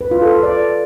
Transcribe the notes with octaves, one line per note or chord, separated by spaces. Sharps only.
B4
F4
A4
A4
D5